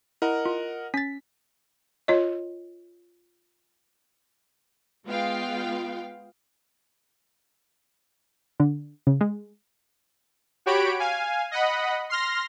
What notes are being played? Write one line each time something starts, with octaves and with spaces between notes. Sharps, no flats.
E4 A#4 D#5 F#5
F4
C#4 A6 B6
F4 C#5 D#5
G#3 B3 F4 F5 G5
D3
C#3
G#3
F#4 G4 C#5 B5 D7
F5 G#5
D#5 F#5 B5
C6 F6 A#6